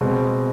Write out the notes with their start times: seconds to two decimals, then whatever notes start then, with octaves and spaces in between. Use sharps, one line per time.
0.01 B2 G#3 C4